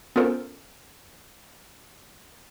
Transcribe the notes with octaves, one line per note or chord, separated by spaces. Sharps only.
B3 C#4 F4 A4 A#4 C5